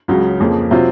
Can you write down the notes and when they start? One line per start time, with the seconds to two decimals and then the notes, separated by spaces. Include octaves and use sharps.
0.08 C#2 C#3 F#3
0.40 F2 C#3 F3 A#3
0.71 C3 F#3 C4 F4